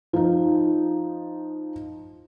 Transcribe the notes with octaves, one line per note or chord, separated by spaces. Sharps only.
F3 D#4